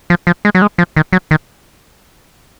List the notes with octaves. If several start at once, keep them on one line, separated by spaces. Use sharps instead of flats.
F3
F3
G#3
F#3
G#3
F3
D#3
F#3
D#3